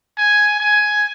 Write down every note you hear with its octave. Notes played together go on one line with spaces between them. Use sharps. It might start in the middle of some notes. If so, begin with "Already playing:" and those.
G#5
G#5